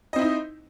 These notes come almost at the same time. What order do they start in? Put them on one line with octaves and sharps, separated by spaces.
D#5 C4 E4 D#4